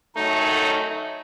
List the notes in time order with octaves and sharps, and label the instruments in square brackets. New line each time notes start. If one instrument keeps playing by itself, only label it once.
[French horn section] F#2 D#3 F#3 A3 [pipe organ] D#4